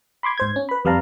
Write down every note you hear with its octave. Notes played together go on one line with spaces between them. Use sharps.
B5 C6 D6 G#6
G#2 C5 G#6
C#4
B4 B5
F2 G3 B4 F5 A5 A#5